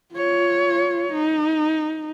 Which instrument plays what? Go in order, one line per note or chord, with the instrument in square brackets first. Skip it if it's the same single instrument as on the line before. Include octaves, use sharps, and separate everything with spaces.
[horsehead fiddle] F4 C#5
D#4